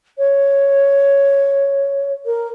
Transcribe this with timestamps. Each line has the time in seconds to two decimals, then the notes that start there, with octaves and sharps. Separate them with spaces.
0.18 C#5
2.26 A#4